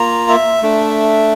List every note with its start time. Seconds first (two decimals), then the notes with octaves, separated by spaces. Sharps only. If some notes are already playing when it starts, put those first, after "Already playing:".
Already playing: A#3 F4 A#5
0.29 E5
0.62 A3 D4